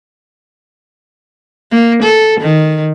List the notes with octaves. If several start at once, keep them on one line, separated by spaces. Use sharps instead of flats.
A#3
A4
D#3